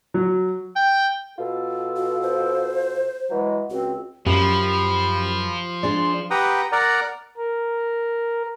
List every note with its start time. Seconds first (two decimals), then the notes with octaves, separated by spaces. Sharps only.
0.14 F#3
0.76 G5
1.39 B2 F4 A4
1.96 F#4
2.22 C5
3.30 E3 F#3 G#3
3.70 C#2 C4 F#4
4.26 F#2 F3 G4 B5
5.83 D4 G#4 D5 C6
6.31 G4 B4 F#5 G5 A#5 D#6
6.72 A#4 D5 F#5 A#5
7.37 A#4